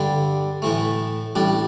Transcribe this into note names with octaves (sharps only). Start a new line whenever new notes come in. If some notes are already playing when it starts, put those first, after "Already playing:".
Already playing: G2 D3 G3
A2 E3 A3
A1 A2 G3 D4